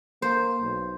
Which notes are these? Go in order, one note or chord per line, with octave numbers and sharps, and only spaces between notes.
A#3 C5
B1